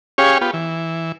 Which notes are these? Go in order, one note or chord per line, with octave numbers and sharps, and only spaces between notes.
C#4 G4 G#4 C#5 F5
B3 F4 G4
E3